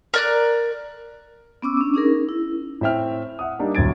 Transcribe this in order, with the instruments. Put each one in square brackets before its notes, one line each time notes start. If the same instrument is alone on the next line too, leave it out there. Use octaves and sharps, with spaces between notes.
[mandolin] A#4 D5 F#6
[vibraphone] B3 C#4 D6 E6
C#4 D4
C#4 D#4 G#4 A#4
E4
[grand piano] A2 C4 E5 G5 F6
E5 F#5 D#6
G3 A#3 D4 D#4
D1 D2 F#3 G#6 A6 D7